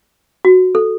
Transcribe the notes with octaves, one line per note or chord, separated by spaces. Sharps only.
F#4
A4